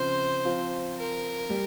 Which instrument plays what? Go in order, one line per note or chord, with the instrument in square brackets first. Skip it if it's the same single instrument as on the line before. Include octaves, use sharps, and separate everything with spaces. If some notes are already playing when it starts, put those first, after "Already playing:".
Already playing: [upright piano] C#3 F3 C4 [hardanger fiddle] C5
[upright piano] F3 C4 F4
[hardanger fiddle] A#4
[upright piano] G3